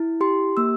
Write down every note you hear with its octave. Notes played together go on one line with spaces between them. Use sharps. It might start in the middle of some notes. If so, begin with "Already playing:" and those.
Already playing: E4
G4 C6
A#3 E6